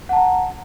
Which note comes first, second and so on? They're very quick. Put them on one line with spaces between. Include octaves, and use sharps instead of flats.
F#5 A5 A#5